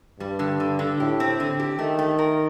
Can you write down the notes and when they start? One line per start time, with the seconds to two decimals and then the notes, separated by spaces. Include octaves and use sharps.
0.20 G2 G3
0.39 D3
0.60 D3
0.79 D3
1.00 A2 G4
1.20 C4
1.40 D3
1.60 G4
1.79 D#3 A3
1.99 A3
2.19 A#4